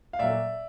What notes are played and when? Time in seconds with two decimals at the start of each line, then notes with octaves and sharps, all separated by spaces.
0.13 F5
0.19 A#2 F#3 A3 D5 E5